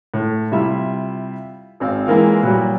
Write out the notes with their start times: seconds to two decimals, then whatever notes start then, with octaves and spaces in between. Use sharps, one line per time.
0.14 A2
0.52 C3 G3 E4 F4 E5
1.80 G#1 C4 F5
2.07 E3 G#3 A#3 F4
2.43 A#2 F#3 G3